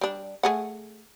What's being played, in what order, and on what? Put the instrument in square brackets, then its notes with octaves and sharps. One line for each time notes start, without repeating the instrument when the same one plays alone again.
[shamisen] G3 D4
A3 G#4 F#5